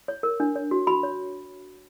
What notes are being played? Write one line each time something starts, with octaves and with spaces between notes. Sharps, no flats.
C#5
A#4
D4
C#5
F#4
F#4 B5
C#5